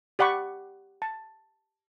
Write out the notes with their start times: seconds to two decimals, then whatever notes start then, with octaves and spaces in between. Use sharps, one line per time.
0.19 G4 D5 F#5 B5 C#6
1.02 A5